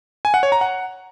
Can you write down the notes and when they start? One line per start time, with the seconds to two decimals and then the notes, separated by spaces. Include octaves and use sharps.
0.25 G#5
0.34 F#5
0.43 C#5
0.52 A#5
0.61 F#5